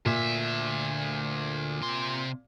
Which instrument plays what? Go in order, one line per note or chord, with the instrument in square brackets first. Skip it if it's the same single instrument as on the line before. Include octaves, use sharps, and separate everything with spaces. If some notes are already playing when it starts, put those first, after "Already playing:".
[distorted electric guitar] D2 E5 [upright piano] A#2
[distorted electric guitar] C3 C6